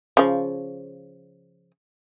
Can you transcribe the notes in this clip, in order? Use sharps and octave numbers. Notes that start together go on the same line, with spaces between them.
C#3 F3